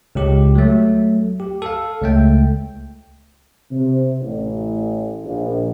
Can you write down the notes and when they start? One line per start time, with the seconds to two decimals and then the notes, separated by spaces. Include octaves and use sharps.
0.15 C#2 G4
0.55 F#3 A3
1.40 G4
1.62 A4 F5
2.02 C#2 A3 G5
3.70 C3
4.21 A1
5.24 A#1